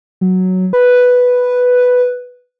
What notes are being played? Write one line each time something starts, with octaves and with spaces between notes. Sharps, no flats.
F#3
B4